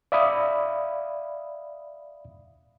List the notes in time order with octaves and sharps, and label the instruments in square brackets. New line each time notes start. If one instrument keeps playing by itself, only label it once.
[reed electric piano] D5 E5 F5 B5 D#6